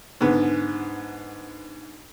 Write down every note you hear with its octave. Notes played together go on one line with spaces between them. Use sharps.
G#2 D3 B3